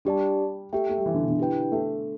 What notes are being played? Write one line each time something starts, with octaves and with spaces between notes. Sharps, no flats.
G3 D4 G4 D5 A5
A3 G4 E5 G5
A3
G3
E3
D3
B2
D3
E4 G4 B4 G5
A3